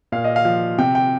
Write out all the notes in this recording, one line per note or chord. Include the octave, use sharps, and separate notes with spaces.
A#2 F5
D#5
F5
F3
C3 G5
G5